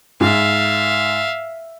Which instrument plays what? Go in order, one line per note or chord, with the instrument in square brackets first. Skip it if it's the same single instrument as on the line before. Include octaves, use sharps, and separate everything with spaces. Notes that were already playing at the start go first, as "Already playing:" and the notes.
[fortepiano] G#2 [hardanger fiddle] E5 F5